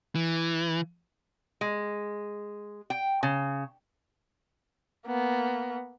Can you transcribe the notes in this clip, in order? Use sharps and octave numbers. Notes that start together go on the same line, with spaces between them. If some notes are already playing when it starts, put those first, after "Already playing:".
E3
G#3
G5
C#3
A#3 B3